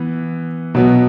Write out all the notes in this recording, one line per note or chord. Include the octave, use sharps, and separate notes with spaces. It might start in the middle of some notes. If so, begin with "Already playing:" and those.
Already playing: E3 B3
B2 F#3 B3